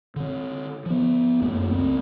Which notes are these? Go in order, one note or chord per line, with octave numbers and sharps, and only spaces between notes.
D3 C4
F3 B3
F#2 A3 A#3
C#2 C4